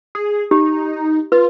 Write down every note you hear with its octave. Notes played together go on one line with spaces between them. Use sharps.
G#4
D#4 G4
F4 B4